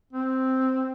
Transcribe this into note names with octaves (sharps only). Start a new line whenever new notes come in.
C4